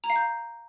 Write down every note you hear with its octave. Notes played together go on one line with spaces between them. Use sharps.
A#5
F5
G6